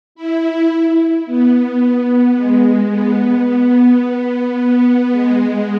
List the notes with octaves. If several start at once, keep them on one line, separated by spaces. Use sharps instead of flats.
E4
B3
G#3
B3
B3
G#3